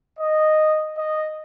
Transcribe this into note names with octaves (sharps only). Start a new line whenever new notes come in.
D#5
D#5